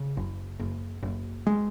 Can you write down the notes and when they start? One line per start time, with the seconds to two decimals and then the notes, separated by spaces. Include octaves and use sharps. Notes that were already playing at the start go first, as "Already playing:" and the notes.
Already playing: C#3
0.17 F#1
0.60 F#1
1.03 F#1
1.47 G#3